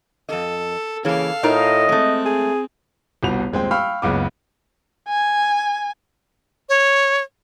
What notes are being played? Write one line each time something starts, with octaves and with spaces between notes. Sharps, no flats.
F2 A4 D#5
C#3 E3 A#3 A4 F5
A2 D#4 F4 A#4 D#5
G#3 A3 C4
G#4
G1 C2 B2 F#4 B4 F7
D#1 G#3 C4 G5
F5 G5 B5 C#6 E6 F6
F#1 C#2 C#3 B3 D6
G#5
C#5